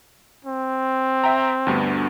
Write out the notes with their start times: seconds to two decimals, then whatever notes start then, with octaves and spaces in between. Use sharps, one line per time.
0.45 C4
1.24 E5 G5 A#5
1.67 D2 G2 B3